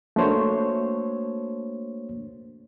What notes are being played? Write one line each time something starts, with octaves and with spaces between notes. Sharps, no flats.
A3 A#3 D4 F#4 C5 C#5